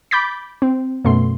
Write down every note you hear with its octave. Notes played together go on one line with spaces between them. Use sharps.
B5 D6 G6 A6 B6
C4
F#2 B2 A3 C6